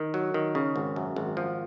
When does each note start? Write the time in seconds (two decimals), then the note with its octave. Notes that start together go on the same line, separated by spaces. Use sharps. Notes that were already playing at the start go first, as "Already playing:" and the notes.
Already playing: D#3
0.14 F#3
0.34 D#3
0.55 C#3
0.76 G#1
0.96 F#2
1.16 G#1
1.37 F3